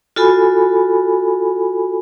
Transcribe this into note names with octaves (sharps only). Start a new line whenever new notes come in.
F4 F#4 A4 G#5 B5